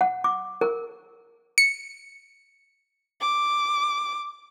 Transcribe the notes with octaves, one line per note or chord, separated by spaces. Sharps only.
F#5
D6
A#4
C#7
D6